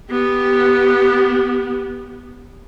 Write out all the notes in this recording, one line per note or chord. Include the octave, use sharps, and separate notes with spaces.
B3 G4